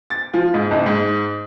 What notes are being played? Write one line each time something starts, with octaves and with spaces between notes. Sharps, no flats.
A6
F3
G#2
F#1
G#2